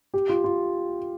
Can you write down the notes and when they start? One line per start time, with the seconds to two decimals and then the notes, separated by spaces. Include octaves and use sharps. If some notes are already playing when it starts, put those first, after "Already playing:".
0.14 G4
0.29 F4
0.44 F4